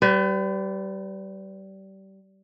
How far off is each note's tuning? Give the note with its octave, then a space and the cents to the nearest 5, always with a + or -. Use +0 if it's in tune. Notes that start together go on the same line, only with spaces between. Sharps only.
G3 -25 B4 +35